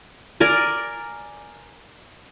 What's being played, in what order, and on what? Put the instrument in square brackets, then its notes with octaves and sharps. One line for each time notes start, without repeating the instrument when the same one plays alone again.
[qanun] A#4 D5 G#5